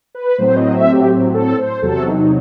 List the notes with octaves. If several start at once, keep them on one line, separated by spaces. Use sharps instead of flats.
B4
A2 F#3 C4 C5
D#5
E5
G4
A4
C5
E2 C3 F#3 A4
D#4
D#4